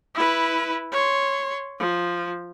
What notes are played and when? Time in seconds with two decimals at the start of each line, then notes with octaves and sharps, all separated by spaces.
0.15 E4 B4
0.92 C#5 C6
1.79 F3